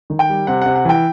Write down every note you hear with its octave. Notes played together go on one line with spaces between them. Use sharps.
D#3
G5
G3
C3 F#5
C3 F#5
F#5
E3 G5